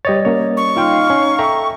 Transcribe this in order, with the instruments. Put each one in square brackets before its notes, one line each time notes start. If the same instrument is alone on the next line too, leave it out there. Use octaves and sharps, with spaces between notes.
[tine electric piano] G3 D#5 A6 [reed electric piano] G4 B4 C#5
[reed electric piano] A#3 C#4 C#5
[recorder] C#6
[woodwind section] D#4 F5 [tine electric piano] F4 G5 C6
[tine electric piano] C#4
[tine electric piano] A4 E5 G5 [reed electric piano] A#5